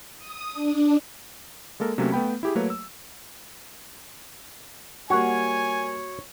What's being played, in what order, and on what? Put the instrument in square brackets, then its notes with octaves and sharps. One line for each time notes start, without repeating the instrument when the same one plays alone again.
[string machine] D#6
D4
[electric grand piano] G#3 A#3 A4 A#4
C3 F#3 A3 A#3 C#4
A3 B3 G5 B5
E4 G4 G#4
F#3 A3 A#3 B4 C#5
E6
[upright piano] G3 A#3 [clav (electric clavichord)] F#4 [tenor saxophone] C#5 [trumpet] G#5